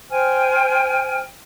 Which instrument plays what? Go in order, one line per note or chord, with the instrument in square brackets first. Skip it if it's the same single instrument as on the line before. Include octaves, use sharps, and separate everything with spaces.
[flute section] C5 G5 G#5 F6